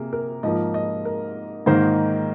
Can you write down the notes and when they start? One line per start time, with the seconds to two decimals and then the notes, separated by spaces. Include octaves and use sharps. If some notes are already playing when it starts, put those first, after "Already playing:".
Already playing: C3 A#3 G#4
0.13 A#4
0.43 G#2 F3 A#3 D#5
0.74 D#5
1.05 A#4
1.66 G#2 D#3 A#3 C5